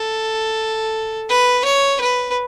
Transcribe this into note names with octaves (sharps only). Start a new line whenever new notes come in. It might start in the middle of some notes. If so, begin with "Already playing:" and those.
Already playing: A4
B4
C#5
B4